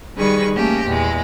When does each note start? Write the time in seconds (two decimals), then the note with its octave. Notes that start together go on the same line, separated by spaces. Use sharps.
0.16 D#3 G3 G#4 B4 C#6
0.55 A3 A#3 C#4 G4
0.88 E2 A#2 G#3